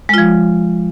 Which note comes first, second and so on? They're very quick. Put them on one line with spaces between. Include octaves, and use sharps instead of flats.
G#3 F4 F3